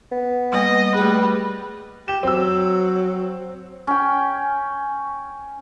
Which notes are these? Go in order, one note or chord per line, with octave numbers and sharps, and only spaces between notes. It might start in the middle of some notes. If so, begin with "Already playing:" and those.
B3
G3 A#3 D#5
G3 A3 G#4 B4
G4 E7
F#3 C4 E6
C#4 G5